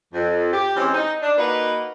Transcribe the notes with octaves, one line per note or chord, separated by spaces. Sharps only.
F2
G4
E3 G#3 C4 C#4
D#4
D4
A#3 D#4 F#4 B4